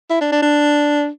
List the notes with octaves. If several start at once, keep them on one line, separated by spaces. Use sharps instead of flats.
E4
D4
D4
D4